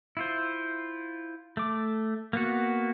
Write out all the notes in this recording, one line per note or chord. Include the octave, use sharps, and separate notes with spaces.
E4 F4 C5
A3 D6
A#3 B3 F#4